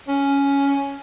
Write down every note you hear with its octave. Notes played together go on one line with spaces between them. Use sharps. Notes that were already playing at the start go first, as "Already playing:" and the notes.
C#4